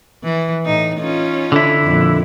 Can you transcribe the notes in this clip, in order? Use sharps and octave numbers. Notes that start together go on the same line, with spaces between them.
E3
A2 D#4
C#4 D#4 F4
D3 E4
F2 A#2